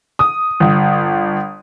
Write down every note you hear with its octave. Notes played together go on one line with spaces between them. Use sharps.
D#6
G1